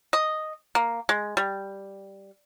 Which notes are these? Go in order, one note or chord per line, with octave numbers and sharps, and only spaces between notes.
D#5
A#3
G#3
G3